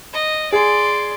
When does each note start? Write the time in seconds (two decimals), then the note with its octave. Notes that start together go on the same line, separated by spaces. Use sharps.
0.13 D#5
0.52 G#4 D5 C6